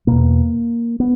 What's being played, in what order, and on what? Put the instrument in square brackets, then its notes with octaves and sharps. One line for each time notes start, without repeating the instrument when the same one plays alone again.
[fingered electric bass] E2 B2 A#3
B3